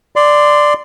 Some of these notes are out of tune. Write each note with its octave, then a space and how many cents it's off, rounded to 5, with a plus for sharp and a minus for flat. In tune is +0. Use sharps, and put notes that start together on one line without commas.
D5 +5 C6 -15